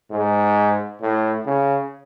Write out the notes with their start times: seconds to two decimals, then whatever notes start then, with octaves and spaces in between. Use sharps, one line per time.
0.11 G#2
1.01 A2
1.46 C#3